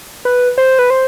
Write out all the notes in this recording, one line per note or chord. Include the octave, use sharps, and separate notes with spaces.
B4
C5
B4
C5